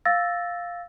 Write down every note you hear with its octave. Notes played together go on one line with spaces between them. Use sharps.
F5 E6 A6 A#6